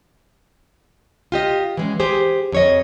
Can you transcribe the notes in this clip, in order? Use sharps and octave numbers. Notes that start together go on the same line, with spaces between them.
F4 G4 D#5
E3 G#3 C#4
G4 G#4 C5
F2 C#5 D#5